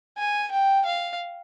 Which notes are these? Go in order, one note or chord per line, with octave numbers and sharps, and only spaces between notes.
G#5
G5
F5